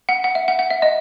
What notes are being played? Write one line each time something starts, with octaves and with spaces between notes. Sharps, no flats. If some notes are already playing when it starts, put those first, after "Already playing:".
F#5
F#5
E5
F#5
F#5
E5
D#5